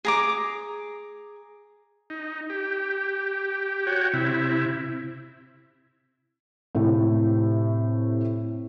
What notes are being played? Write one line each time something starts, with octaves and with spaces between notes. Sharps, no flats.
G#4 A#5 D6
D#4
G4
F#4 C#5 G5
C3 E4
A2 C3 A3